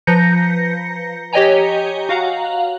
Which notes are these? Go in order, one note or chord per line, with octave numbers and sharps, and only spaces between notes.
F3 B4 A#5 G6 A#6 C#7
G4 C#5 D#5 G5 G#5 A#5
F#4 F5 F#5 A#5